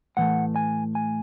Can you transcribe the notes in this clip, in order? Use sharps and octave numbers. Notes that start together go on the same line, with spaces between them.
A2 E3 A3 F#5
G#5
G#5